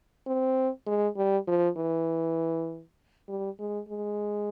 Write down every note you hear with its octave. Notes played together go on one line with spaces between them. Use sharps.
C4
G#3
G3
F3
E3
G3
G#3
G#3